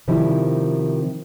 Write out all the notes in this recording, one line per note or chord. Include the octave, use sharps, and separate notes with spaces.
C3 D#3 F3 G3 D#4 E4